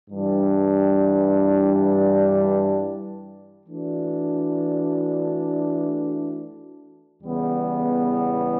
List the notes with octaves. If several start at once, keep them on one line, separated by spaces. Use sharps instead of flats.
G2 E3 G3 D4
E3 A3 D4 F#4
E2 C#3 E3 G3 B3